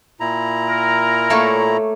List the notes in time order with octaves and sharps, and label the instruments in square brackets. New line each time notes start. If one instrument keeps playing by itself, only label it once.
[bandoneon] A#2 E4 A#5
[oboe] A#4
[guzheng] A3 A#3 C#5